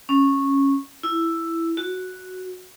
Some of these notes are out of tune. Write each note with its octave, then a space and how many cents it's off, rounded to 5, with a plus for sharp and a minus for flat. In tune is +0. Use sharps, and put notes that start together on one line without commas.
C#4 -10
E4 +5
F#4 +0